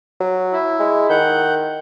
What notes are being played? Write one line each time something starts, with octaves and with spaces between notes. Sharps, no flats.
F#3
E4
G#3
D#3 F#5 G6